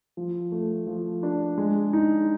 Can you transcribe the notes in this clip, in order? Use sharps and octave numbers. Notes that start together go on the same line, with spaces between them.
F3
A3
F3
D4
G#3
D#4